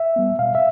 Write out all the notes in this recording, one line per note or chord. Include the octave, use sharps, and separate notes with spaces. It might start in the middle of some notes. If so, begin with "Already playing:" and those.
Already playing: E5
G3 B3
B2 F5
E5